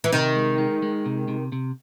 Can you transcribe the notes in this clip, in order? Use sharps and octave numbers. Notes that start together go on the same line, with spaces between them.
E3
C3 D#3
G#3
G#3
G#3
C3
C3
C3